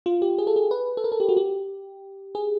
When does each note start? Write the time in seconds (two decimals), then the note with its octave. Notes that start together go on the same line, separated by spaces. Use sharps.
0.06 F4
0.22 G4
0.38 G#4
0.47 A4
0.56 G#4
0.71 B4
0.97 A4
1.04 A#4
1.12 A4
1.20 G4
1.29 F#4
1.37 G4
2.35 G#4